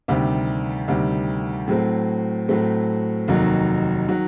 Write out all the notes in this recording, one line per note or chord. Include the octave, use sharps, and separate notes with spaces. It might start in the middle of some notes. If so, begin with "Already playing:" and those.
D2 C3 D#3 G3
D2 C3 D#3 G3
A2 F#3 A3 C4
A2 F#3 A3 C4
F1 D#2 D#3 F#3
D#3 F#3